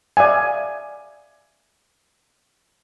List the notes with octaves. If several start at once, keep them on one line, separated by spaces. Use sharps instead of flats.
D5 E5 F5 G#5